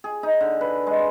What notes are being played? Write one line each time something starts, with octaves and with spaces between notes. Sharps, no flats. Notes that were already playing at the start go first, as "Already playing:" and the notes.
G#4
D#4
D3
B4
G#3